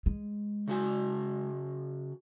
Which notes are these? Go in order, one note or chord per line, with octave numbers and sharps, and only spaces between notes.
G#3
C#3 F#4 G#5